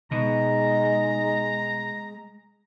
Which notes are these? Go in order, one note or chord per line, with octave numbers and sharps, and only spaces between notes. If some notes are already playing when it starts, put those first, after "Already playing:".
B2 G#3 D#4 A#5